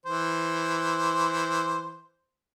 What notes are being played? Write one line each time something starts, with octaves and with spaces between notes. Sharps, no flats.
E3 C5